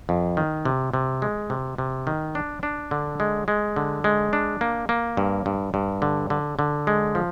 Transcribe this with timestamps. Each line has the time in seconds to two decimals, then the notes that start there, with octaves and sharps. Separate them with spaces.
0.09 F2
0.37 D#3
0.65 C3
0.94 C3
1.22 G#3
1.50 C3
1.78 C3
2.07 D#3
2.35 D4
2.63 D4
2.91 D3
3.20 G#3
3.48 G#3
3.76 D3
4.04 G#3
4.33 D4
4.61 A#3
4.89 A#3
5.17 G2
5.46 G2
5.74 G2
6.02 D3
6.30 D3
6.59 D3
6.87 G#3
7.15 F3